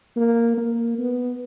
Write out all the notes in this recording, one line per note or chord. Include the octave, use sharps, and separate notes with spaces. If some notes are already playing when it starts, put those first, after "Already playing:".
A#3
A#3
B3